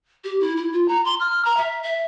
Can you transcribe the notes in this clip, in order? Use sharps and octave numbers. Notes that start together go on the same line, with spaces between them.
G4
E4
E4
F4
A#5
C6
F6
A#5
E5
E5